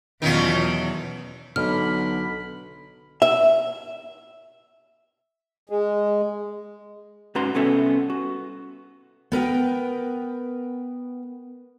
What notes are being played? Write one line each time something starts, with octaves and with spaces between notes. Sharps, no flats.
E2 B2 D#3 F#3 C#4 F4
B1 D3 B5 F6
E5
G#3
G#2 C#4 F#4 B4 A#5 C6
C2 B3 C#4 A4 E5
F#4
B3 A#4 B4 G5